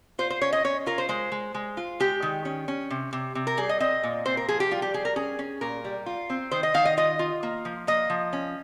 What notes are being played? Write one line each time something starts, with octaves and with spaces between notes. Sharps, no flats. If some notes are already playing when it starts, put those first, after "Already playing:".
F4 C5
C5
C#4 C#5
D#5
C#4 C#5
F4 A#4
C5
G#3 C5
G#3
G#3
F4
G#3 G4
D#3
C#4
C#4
C3
C3
C3
A#4
G3 G#4
D#5
C4 D#5
A#2
C4 C5
A#4
F3 G#4
G4
G3 F4
G4
G3 G#4
A#4
C#4 G#4
C#4
A#2 A#4
G3
F4
C4
D#3 C5
D#5
D#3 F5
D#5
F4 D#5
F4
A#3
F3
A#3 D#5
F3
C#4